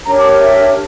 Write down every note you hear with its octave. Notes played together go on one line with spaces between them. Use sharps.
D4 G4 A#4 C#5 A#5
D6
E5